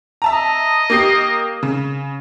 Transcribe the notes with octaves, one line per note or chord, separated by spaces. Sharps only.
E5 A5 A#5
D#5
A#3 G4 C7
C#3